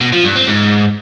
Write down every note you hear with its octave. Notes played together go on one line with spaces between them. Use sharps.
B2
F3
G2
C4
G#2